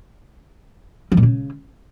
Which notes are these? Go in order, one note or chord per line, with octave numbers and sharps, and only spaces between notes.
F3
A#2
C#3